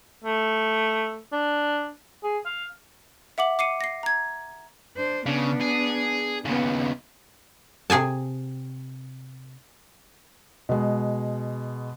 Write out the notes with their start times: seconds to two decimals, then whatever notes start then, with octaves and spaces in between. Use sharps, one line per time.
0.24 A3
1.32 D4
2.24 G#4
2.46 F5
3.38 E5 F#5 D6 F#7
3.59 D6 C7 C#7 D#7
3.81 A#6 C7
4.03 A#5 G#6
4.97 D4 C5
5.26 C#3 B3 D4
5.61 G#4
6.45 D#2 C#3 B3 C#4
7.90 C3 G#4 G#5 A5
10.69 B2 G#3